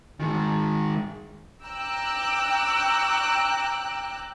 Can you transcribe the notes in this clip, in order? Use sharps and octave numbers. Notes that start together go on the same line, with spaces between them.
D#3 G#3
G5 A#5 D6 E6 F#6